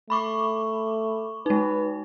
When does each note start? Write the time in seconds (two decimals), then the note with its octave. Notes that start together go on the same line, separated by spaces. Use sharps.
0.10 A3 B5 C#6 D6
1.46 G#3 D#4 B4